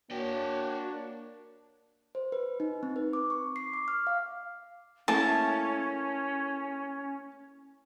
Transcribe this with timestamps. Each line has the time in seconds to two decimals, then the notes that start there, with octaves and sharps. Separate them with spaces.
0.11 A#3 D4 F#4 C#5 G5
2.15 C5
2.32 B4
2.60 D#4
2.83 C4
2.96 B4
3.13 D6
3.30 C#6
3.56 C7
3.74 D6
3.88 F6
4.07 F5
5.08 A3 A#3 C#4 E4 A5